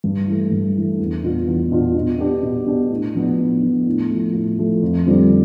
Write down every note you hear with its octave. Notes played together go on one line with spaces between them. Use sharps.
G2
E3 A3
G2
E3 A3
E2
B2 B3 D4 F4
E2
B2 B3 D4 F4
B2
B3 D4 G4
B2
B3 D4 G4
A2
F3 B3 D4
A2
F3 B3 D4
A2
F3 A3
A2
F3 A3
F2
D3 G3 C4 F4